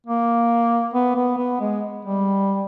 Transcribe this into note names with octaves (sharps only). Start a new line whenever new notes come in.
A#3
B3
B3
B3
G#3
G3